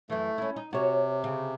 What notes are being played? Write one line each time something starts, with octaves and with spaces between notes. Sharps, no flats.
F#2 E3 A3
C#4 E4
D#4
C3 F#4 C#5
C#3